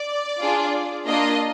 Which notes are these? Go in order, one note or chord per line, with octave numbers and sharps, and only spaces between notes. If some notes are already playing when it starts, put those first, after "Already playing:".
Already playing: D5
D4 F4 G#4
A#3 D4 F4 D#5